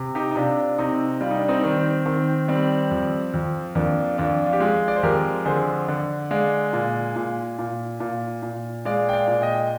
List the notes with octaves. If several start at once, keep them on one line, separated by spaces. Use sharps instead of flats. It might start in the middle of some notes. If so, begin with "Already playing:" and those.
Already playing: C3
D#4 G4
D#4
C3 D4 F4
C3 C4 D#4
G3 F4
D#4
D4
C4 D#4
D#3 C4
D#3 C4
G3 C4
F2
F2
F2 A#3 D4
F2 D4 F4
F4
G4
G#3 F4 G#4
D5
C5
F2 G4 A#4
D3 G#4 C5
D3
G#3 D5 F5
A#2
A#2
A#2
A#2
A#2
G#3 D5 F5
G5
D5 F5
A#2
D#5 G5